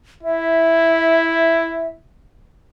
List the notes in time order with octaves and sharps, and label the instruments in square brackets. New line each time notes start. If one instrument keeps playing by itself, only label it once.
[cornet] E4 [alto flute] E5